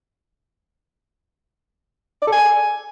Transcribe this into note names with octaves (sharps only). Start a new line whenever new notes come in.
D5
A4
G#5